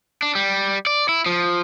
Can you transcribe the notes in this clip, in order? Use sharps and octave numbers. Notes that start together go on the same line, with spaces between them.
D4
G3
D5
E4
F3